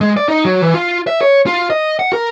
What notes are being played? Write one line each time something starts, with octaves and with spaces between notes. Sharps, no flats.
G#3
D5
D#4
F#3
E3
F4
E5
C#5
F4
D#5
F#5
A#4